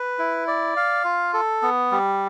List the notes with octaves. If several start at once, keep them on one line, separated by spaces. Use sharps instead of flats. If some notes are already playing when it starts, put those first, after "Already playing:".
Already playing: B4
E4
D5
F5
F4
A4
B3
G3